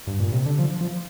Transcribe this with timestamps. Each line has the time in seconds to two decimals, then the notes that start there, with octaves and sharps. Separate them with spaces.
0.07 G2
0.20 A#2
0.33 C3
0.46 D3
0.59 F3
0.81 F3